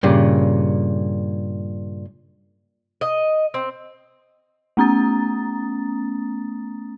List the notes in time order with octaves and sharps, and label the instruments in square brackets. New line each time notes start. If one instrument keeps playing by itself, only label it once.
[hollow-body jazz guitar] G2 A#2 C#3
[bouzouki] D#5
C4
[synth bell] A3 B3 C#4 A#5 D#6 A6